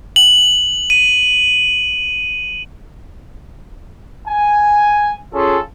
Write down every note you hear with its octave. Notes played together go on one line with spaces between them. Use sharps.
F#7
D#7
G#5
C#4 F4 G#4 A4